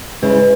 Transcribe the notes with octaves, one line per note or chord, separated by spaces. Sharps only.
C#3 G#3 C#4 E4 B4